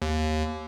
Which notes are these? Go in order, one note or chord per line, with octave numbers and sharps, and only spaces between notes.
D#2